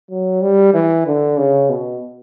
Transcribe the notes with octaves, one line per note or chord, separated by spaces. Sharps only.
F#3
G3
E3
D3
C#3
B2